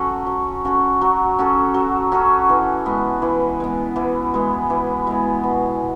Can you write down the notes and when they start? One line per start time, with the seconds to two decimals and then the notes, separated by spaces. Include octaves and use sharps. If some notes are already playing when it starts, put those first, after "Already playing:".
Already playing: F#3 C#4 F#4 A4
0.27 F#3
0.65 C#4 F#4 A4
1.01 F#3
1.39 C#4 F#4 A4
1.74 F#3
2.12 C#4 F#4 A4
2.49 E3
2.85 G#3 B3
3.22 E3
3.60 G#3 B3
3.96 E3
4.34 G#3 B3
4.70 E3
5.07 G#3 B3
5.43 B2